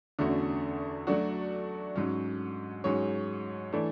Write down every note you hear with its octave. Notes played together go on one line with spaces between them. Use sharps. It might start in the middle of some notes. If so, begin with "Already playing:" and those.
E2 D3 A3 C#4 F#4
F#3 A3 D4 F#4
G#2 F#3 C#4
G#2 F#3 C#4 G#4 C#5
E3 A3 D4